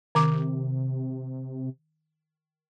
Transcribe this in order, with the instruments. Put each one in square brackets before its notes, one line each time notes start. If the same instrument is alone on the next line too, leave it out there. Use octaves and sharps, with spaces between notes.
[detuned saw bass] C3 [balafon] D#3 D6